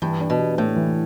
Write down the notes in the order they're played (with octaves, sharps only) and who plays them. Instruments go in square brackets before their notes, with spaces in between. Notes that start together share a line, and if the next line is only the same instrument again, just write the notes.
[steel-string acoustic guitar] G2 [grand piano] E3
[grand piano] D4
[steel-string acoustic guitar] B2
[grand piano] G4
[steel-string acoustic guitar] A2 [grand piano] A3
[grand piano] E3